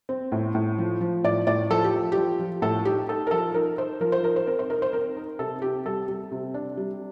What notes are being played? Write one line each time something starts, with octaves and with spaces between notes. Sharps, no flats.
C4
A2
A2
F3
F3
A2 D5
A2 D5
F3 A4
G4
F3
F3 G4
F3
A2 A4
D#4 G4
D#4 A4
A#4
F3 A4
D#4 A#4
D#4 C5
F3 A#4
C5
D#4 A#4
C5
C4 A#4
C5
D#4 A#4
C5
C4 A#4
D#4
C3 A4
C3 G4
G3 A4
G3
C3
D4
G3